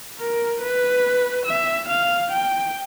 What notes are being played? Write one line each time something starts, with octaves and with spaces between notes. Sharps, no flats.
A#4
B4
E5
F5
G5